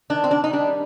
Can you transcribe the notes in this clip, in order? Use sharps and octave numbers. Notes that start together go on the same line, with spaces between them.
D#3 D4
C4
D4
D#4
G3 D4